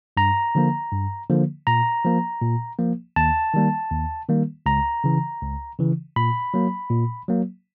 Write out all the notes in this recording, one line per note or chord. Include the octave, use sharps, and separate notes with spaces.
G2 A#5
D3 F3 A#3
G2
D3 F3 A#3
A#2 A#5
F3 A#3
A#2
F3 A#3
D#2 A5
D#3 G3 A#3
D#2
D#3 G3 A#3
C#2 A#5
C#3 E3
C#2
C#3 E3
A#2 B5
F#3 A#3
A#2
F#3 A#3